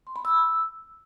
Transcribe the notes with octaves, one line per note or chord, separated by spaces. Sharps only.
C6
B5
E6